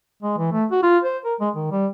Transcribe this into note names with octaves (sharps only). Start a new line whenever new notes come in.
G#3
E3
A3
F#4
F4
C5
A#4
G#3
D#3
G3